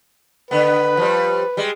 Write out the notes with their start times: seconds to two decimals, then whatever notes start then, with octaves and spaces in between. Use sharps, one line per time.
0.51 D3 B3 B4
0.97 F3 G3
1.57 G3 G#3